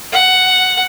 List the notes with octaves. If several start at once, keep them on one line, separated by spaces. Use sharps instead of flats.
F#5